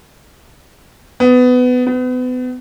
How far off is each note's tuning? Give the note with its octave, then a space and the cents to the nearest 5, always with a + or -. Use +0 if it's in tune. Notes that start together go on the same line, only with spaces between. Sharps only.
B3 +20
B3 +35